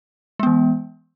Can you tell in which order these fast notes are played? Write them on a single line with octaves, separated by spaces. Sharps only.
G#3 B3 E3